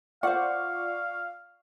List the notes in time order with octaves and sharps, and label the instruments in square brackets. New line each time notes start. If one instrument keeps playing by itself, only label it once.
[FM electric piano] F4 D5 C#6 [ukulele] C5 F#5 [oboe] F5